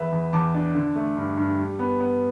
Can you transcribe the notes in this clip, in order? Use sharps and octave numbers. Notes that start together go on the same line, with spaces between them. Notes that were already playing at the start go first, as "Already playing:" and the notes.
Already playing: E2 B4 E5
E2
E2 A5 D6
D4
D3
A3
G2
G2
G3
B3
B3